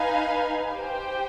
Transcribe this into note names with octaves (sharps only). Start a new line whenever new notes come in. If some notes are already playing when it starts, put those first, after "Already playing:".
Already playing: D#4 B4 F5 G#5
G4 C5 G5